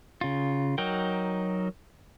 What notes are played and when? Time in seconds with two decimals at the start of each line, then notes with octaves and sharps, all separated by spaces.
0.21 C#3 F4
0.78 F#3 D#4 F#4 A#4 G5